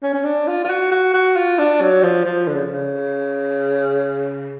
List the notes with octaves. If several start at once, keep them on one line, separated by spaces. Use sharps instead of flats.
C#4
C#4
D4
F4
F4
F#4
F#4
F#4
F4
D4
F#3
F3
F3
D3
C#3
C#3